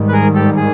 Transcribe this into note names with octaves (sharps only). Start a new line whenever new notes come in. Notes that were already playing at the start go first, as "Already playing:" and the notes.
Already playing: G#2 D#3 G3
B4
G#4 A#4
G4 A4
G#4